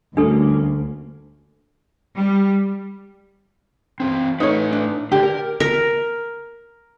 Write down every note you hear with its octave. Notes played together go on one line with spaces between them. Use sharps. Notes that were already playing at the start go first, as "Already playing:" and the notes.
D2 G3 A#3 C#4 D4 A4
G3
E3 C4
A2 D#4 A4 B4 C#5
D4
D3 G4 D5
A#4
A#4